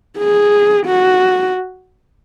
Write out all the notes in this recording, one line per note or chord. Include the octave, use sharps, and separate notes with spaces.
G#4
F#4